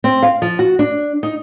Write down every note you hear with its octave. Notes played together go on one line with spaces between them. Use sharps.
C4
F5
F3
F#4
D4
D#4